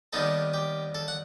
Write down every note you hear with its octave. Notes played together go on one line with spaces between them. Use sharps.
D#2 D#3 G3 B3 D#4 A4
G4
A4
F#5